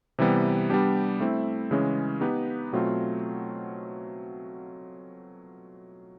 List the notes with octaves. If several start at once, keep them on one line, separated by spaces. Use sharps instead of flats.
C3 E3 G3 B3
G3 B3 D4 G4
A3 C4 E4
C#3 E3 G#3 C#4
B3 D#4 G4 B4
B2 F#3 A3 C4 F4